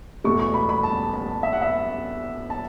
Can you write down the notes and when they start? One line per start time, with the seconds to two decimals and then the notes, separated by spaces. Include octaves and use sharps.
0.24 E2 B2 A3 C#6
0.39 C#6
0.54 B5
0.69 B5
0.83 A5
1.14 A5
1.43 E5
1.53 F#5
1.62 E5
2.50 A5